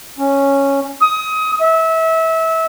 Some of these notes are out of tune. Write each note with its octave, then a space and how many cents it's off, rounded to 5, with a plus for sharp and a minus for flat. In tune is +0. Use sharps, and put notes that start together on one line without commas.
C#4 -5
D#6 +25
E5 -25